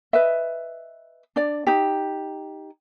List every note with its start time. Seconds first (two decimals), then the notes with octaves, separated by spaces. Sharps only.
0.13 B4 D#5 E5
1.36 D4 D5
1.67 D#4 G4